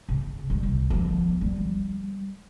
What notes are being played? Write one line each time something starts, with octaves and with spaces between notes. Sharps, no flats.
C#3
G3
C2
F3 B3
G3